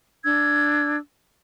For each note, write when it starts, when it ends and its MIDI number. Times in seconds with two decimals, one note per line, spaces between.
0.24 0.96 62
0.24 0.96 88
0.24 0.96 92